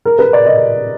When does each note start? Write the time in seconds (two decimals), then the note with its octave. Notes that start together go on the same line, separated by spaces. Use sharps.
0.05 A#4
0.19 B4
0.33 D5
0.46 D#5